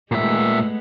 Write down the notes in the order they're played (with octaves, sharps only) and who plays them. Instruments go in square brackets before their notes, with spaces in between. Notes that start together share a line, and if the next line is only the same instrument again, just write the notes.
[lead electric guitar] A#2 E5 [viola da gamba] G#3 A3 B3